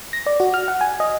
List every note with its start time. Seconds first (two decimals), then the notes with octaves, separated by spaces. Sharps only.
0.13 A#6
0.26 D5
0.40 F#4
0.54 F6
0.68 F#5
0.81 G#5
1.00 D#5